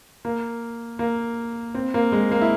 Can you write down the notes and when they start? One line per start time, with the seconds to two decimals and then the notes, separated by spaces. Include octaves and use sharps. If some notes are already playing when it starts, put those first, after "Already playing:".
0.25 A#3
0.99 A#3
1.75 C4
1.94 A#3
2.12 G#3
2.32 A#3
2.41 E4